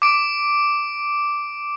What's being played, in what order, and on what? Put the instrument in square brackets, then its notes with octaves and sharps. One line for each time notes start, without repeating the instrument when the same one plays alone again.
[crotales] D6 D7